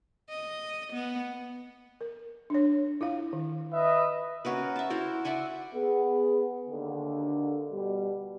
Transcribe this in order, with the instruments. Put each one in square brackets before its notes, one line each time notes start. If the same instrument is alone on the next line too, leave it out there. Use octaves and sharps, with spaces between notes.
[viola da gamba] D#5
B3
[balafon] A#4
D4 C#5
E4 F4 F5
D#3
[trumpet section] B4 D#5 E5
[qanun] C#4 F#4 A#4 B4
E5 A5
E4 F#4 A#4 C5
D5 E5 F#5 G#5
[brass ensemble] B3 G#4
D#2 D3
B2 G3